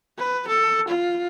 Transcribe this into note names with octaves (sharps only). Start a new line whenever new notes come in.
B4
A4
F4